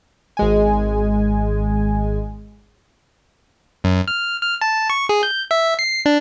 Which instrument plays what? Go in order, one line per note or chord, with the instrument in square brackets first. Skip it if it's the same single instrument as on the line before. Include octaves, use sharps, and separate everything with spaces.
[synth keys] G#1 G#3 G#5
[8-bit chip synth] F#2
F6
F6
A5
C#6
G#4
G6
E5
C7
D4